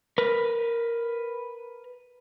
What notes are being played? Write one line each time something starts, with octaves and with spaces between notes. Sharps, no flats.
A#4 B4